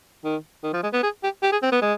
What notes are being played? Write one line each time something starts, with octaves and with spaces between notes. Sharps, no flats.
D#3
D#3
F3
G#3
B3
G#4
G4
G4
G#4
C4
B3
G#3